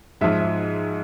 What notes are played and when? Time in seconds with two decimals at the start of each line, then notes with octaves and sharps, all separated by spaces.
0.21 G#2 F3 E5
0.40 E5